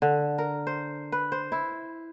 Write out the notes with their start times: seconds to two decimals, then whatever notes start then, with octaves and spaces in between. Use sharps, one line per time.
0.02 D3
0.38 A#4
0.67 C5
1.12 B4
1.32 C5
1.52 E4